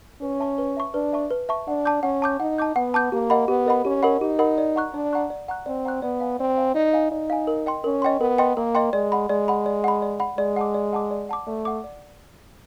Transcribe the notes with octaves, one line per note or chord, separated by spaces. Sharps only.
C#4 B4
E5 A5 C#6
B4
E5 A5 C#6
D4 B4
E5 A5 C#6
B4
E5 A5 C#6
D4 F#5
A5 D6 G6
C#4 F#5
A5 D6 G6
D#4 F#5
A5 D6 G6
B3 F#5
A5 D6 G6
A#3 G4
A#4 D#5 F#5 B5
B3 G4
A#4 D#5 F#5 B5
C#4 G4
A#4 D#5 F#5 B5
D#4 G4
A#4 D#5 F#5 B5
D5
F#5 A#5 C#6 F#6
D4 D5
F#5 A#5 C#6 F#6
D5
F#5 A#5 C#6 F#6
C4 D5
F#5 A#5 C#6 F#6
B3 D5
F5 G#5
C4 D5
F5 G#5
D#4 D5
F5 G#5
D#4 D5
F5 G#5
A#4
D#5 G5 C6
C#4 A#4
D#5 G5 C6
B3 A#4
D#5 G5 C6
A#3 A#4
D#5 G5 C6
G#3 D5
F#5 B5
G#3 D5
F#5 B5
D5
F#5 B5
D5
F#5 B5
G#3 D5
F#5 A5 D6
D5
F#5 A5 D6
D5
F#5 A5 D6
A3 D5
F#5 A5 D6
D5